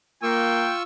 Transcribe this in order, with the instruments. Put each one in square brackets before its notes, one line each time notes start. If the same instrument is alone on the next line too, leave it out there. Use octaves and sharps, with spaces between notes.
[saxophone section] A#3 [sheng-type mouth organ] F4 C#6 E6 [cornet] G5